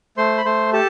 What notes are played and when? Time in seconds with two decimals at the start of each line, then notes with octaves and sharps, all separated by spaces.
0.17 A3 C5 C6
0.38 B5
0.45 A3 C5 C6
0.73 G4 A4 A5